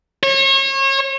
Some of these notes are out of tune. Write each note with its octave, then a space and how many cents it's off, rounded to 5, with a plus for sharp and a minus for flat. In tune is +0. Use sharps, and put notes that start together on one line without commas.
C#5 -35